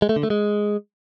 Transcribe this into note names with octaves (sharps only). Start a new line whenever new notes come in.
G#3
A3
D3
A3
G#3